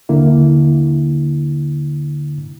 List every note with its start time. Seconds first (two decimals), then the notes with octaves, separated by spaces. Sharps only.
0.09 D#2 D3 A#3 E4